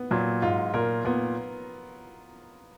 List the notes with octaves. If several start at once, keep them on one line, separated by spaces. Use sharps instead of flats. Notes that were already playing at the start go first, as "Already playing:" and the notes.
Already playing: B3
A#2 F#3
G#2 F4
A#2 A#4
A#2 B3